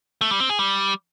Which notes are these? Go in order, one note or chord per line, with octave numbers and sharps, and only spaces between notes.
A3
G3
C4
G#4
G3